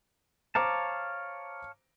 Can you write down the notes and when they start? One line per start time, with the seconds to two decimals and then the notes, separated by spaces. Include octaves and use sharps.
0.55 C5 C#5 F5 A5 A#5 D6